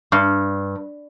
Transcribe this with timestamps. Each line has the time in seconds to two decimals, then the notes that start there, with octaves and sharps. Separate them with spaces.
0.12 G2